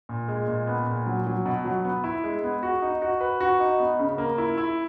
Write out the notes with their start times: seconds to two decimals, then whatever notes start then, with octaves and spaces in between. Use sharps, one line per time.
0.09 A#2
0.28 G#3
0.48 A#2
0.67 B3
0.86 A#2
1.06 F#3
1.27 F#3
1.46 B2
1.65 F#3
1.85 B3
2.04 E4
2.24 G#3
2.44 B3
2.63 F#4
2.82 D#4
3.02 F#4
3.21 B4
3.41 F#4
3.60 D#4
3.80 B3
3.99 C#3
4.18 A#3
4.38 E4
4.57 E4